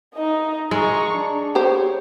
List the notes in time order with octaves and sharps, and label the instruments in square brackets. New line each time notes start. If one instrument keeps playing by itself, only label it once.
[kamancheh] D#4 D#5
[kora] G#3 [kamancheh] A#5 C#6
[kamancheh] D4
[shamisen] G4 C5 [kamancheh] C#5